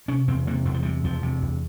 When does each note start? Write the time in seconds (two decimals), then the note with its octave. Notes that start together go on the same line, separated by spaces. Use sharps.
0.08 C3 C#4
0.28 E2 C4
0.47 C3 A#3
0.65 E2 G3
0.74 F3
0.83 C3 G3
1.04 E2 F3
1.23 C3
1.42 E2